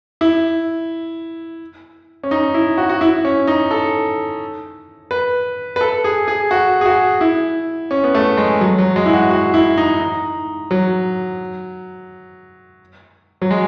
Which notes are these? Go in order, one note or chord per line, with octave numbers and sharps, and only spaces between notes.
E4
C#4
D#4
E4
F#4
F#4
E4
C#4
D#4
A4
B4
B4
A4
G#4
G#4
F#4
G#4
F#4
E4
C#4
B3
A3
G#3
F#3
F#3
G#3
E4
F#4
F#4
E4
D#4
D#4
F#3
F#3
G#3